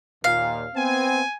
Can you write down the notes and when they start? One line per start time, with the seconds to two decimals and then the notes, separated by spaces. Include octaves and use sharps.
0.24 D#2 A#2 F5
0.75 B3 C4 G#5